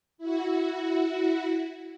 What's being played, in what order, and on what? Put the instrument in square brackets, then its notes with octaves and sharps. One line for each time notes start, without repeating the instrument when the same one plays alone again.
[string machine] E4 F#4